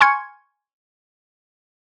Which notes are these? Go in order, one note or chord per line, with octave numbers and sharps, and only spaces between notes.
G#5 C6 C#6 F6 G#6 C#7